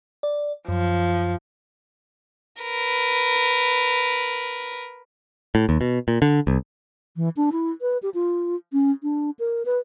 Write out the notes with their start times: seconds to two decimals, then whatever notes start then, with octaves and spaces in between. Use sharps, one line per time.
0.23 D5
0.68 F#2 F3
2.62 A#4 B4
5.55 A2
5.69 D#2
5.81 B2
6.08 A#2
6.22 D3
6.47 C2
7.16 E3
7.37 D4
7.52 E4
7.81 B4
8.03 G4
8.14 F4
8.73 C#4
9.03 D4
9.39 A#4
9.66 B4